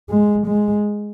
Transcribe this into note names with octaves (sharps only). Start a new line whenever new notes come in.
G#3
G#3